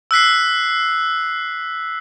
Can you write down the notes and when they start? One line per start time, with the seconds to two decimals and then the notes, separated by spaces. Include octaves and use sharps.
0.11 E6 F#6 B6 C7